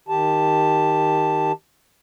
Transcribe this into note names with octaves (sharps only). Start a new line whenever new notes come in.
D#3 G4 A5